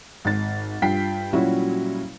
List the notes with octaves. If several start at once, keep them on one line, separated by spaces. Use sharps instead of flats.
G#1 A6
G2 F4 G5 B6 C7
A#2 F#3 G3 C#4 E4 F#4